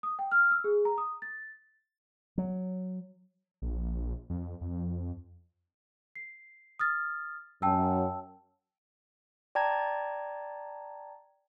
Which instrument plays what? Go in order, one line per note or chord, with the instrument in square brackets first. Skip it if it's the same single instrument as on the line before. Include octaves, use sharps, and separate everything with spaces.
[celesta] D#6
G5
F6
E6
G#4
A#5
D#6
A6
[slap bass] F#3
[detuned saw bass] A#1
F2
F2
[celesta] C7
D#6 F6 A6
[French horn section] F#2 [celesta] G5 A5 E6
[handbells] D5 G5 A5 A#5 G#6